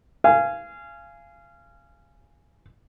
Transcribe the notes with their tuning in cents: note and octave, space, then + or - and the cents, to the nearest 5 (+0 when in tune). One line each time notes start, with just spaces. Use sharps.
F5 -25 G#5 +0